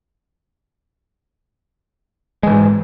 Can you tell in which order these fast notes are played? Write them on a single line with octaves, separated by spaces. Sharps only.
G#3 E3 G#2